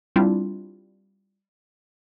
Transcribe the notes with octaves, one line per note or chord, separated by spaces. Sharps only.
G3 C4 D4 E4 F4